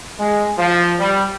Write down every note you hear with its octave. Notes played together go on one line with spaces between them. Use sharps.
G#3
F3
G3